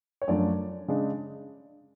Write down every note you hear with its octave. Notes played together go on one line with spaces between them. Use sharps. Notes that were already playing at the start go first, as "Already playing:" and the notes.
C#5
F#2 F3 A3 D4 D5
C#3 G#3 D4